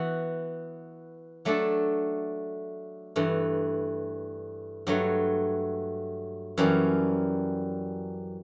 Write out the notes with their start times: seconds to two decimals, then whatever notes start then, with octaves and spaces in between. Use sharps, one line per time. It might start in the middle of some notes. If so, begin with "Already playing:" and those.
Already playing: E3 B3 F#4
1.45 F#3 A3 D4 A4
3.16 G2 E3 A3
4.87 G2 F#3 A3
6.58 F#2 E3 G3 C#4